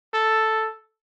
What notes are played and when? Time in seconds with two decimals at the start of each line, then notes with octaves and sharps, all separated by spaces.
0.14 A4